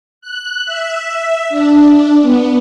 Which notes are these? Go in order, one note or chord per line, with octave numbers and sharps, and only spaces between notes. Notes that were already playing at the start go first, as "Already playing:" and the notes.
F#6
E5
D4
B3